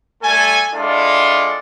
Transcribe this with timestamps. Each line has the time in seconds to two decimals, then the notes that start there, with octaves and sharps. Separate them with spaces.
0.22 G3 A3 A4 G#5
0.73 G#3 D4 E4 F4 A4 D5